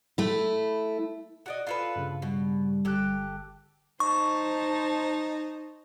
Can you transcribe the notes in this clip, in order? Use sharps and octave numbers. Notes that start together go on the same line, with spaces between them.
A3 E4
F#4 D5 D#5
F4 A4 B4
G2 C#3
B2 G3
G1 G4 A4 F#6
D#4 C5 A5 C#6